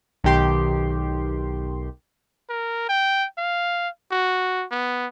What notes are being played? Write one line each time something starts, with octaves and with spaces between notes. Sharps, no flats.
B1 D#3 G4 C6
A#4
G5
F5
F#4
B3